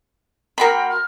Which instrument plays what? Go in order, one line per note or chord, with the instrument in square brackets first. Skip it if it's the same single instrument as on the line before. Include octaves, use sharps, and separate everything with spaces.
[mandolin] A#3 F#4 C6 [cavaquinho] A#4 B5 [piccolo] G5
[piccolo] F6